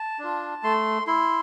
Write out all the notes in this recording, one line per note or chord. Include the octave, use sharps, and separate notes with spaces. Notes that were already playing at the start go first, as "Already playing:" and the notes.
Already playing: A5
D4 F4
A3 C6
E4 C6